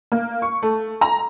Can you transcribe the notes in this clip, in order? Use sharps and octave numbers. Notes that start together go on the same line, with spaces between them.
A#3
C#6
A3
A#5